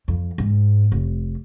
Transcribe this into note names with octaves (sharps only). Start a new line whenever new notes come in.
F2
G#2
F1